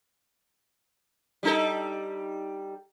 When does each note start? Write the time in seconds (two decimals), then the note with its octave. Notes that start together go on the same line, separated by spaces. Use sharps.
1.43 G3 D#4 A4